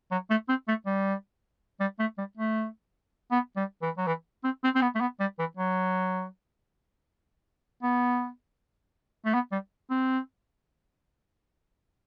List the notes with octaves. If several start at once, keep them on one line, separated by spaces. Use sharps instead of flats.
F#3
A3
C4
A3
G3
G3
A3
G3
A3
B3
G3
E3
F#3
E3
C4
C4
C4
B3
A3
B3
G3
E3
F#3
B3
A3
B3
G3
C4